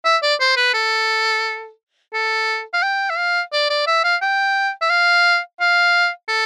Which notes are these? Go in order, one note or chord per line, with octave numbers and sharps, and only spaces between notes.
E5
D5
C5
B4
A4
A4
F5
G5
E5
F5
D5
D5
E5
F5
G5
E5
F5
F5
A4